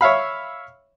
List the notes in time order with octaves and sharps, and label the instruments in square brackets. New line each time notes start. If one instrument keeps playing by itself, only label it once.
[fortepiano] C#5 E5 F5 B5